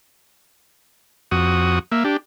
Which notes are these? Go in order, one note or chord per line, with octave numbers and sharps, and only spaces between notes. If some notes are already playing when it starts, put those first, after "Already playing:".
F2 F#4 D#6
A#3 E5
D4 G4